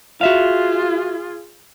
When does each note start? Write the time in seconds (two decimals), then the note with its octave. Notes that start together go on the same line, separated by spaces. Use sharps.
0.21 F4 F#4 G#4 E5 F5